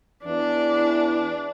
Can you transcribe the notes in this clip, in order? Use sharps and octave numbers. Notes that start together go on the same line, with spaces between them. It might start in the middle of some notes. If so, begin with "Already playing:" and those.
E2 E3 D4